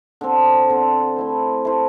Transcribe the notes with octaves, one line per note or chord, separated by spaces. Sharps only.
D3 C4 A4
D3 C4 A4
A3 E4 C5
A3 E4 C5